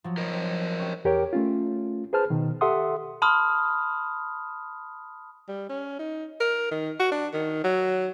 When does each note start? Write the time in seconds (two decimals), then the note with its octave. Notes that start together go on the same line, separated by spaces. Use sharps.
0.04 F3 F#3
0.17 A#4 C5 D#5 D7
0.33 C4
0.79 C#4 G4
1.05 E2 G4 A#4 C#5 G5
1.33 A3 C#4 F4
2.13 G#4 B4 C5 A5 F6
2.30 B2 D#3
2.61 G4 A4 E5 F#5 C6 D#6
3.22 A5 B5 C6 D#6 F6
5.48 G3
5.69 C#4
5.99 D#4
6.40 A#4
6.71 D#3
6.99 F#4
7.12 D4
7.33 D#3
7.64 F#3